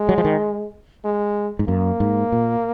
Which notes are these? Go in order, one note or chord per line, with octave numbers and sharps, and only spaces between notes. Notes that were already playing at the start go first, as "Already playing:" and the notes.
Already playing: G#3
F#3
F3
D#3
G#3
G#2
F#2 A#3
G#2
A#2